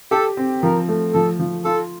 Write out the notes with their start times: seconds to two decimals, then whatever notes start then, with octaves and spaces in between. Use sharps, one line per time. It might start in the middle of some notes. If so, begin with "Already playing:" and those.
0.11 G4 A4
0.37 C4
0.62 F3 A#4
0.89 A3
1.13 F3 A4
1.39 F3
1.65 F4 A4